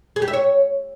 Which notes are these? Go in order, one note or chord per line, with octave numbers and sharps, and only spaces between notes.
G#4
G4
E5
C#5